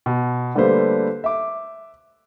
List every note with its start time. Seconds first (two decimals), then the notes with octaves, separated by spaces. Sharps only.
0.06 B2
0.55 D3 G3 A3 A#3 B4 C5
1.24 E5 D6